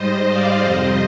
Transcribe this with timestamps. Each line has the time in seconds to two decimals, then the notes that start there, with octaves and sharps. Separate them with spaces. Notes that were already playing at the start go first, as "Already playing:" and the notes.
Already playing: G#2 G3 C5 D#5
0.27 D5 F5
0.61 F2 C3 G3 C5 D#5